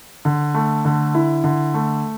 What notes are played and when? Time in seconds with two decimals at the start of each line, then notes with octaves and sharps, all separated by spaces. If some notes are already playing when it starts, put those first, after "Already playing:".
0.25 D3
0.54 A3
0.85 D3
1.15 E4
1.44 D3
1.74 A3